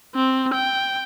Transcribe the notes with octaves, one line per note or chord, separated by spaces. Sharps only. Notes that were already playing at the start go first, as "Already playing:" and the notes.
C4
G5